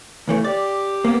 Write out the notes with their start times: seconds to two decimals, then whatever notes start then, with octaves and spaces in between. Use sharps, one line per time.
0.28 C#2 E3 A3
0.44 G4 D5
1.04 A#3 B3